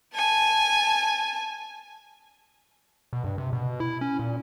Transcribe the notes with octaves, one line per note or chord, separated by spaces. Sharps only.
G#5 A5
B2
G2
C3
B2
E4
C#4
A#2